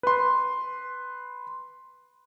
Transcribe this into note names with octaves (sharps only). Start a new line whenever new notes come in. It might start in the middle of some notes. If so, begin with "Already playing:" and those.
B4 C6